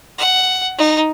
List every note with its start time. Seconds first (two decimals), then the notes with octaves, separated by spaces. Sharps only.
0.18 F#5
0.78 D#4